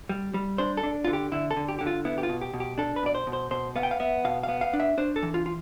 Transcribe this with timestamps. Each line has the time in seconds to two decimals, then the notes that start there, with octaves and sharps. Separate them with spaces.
0.09 G3
0.34 G3
0.58 D4 C5
0.77 A4
0.83 D4
1.04 D3 F4
1.13 G4
1.32 D3 E4
1.51 A4
1.57 D3
1.68 G4
1.79 D3 G4
1.87 F4
2.05 B3 E4
2.18 G4
2.23 F4
2.29 B2
2.41 G4
2.53 B2
2.60 G4
2.78 D4 A4
2.96 B4
3.03 B2 D5
3.15 C5
3.27 B2
3.33 C5
3.51 B2 C5
3.76 B3 F5
3.83 G5
3.91 F5
4.00 B3 E5
4.25 B2 F5
4.43 F5
4.49 B3
4.61 F5
4.73 D4
4.80 E5
4.98 D4 C5
5.16 A4
5.23 E3
5.34 F4
5.46 F4